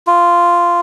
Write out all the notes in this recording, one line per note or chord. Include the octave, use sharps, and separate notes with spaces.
F4